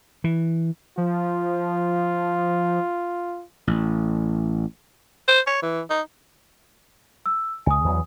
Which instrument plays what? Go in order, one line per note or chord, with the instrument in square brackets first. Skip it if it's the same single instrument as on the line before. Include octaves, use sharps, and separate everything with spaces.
[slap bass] E3
[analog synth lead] F3 [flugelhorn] F4
[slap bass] A1
[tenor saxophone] C5
C#5
E3
D#4
[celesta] E6
[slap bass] C#2 [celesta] G#5 D#6
[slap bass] E2 E3 F#3